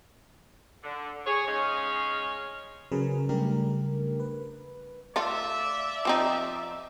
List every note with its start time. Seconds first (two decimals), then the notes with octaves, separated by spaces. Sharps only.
0.84 D3
1.26 G#4 C#5
1.47 G#3 C#4 D#4 G#4 C#5 F5
2.92 C#3 F#3 G#4 A#4 B4
3.29 C#3 G3 A3 D4 G4 A#4
4.20 B4
5.16 A3 F4 D5 E5
6.05 F3 C4 D#4